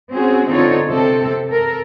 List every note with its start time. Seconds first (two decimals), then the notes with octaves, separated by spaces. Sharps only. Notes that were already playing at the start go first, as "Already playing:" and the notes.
0.13 C4 C#4 F#4 G#4
0.49 D3 C4 D#4 F4 A4 C#5
0.88 C3 C4 A4
1.49 A4 A#4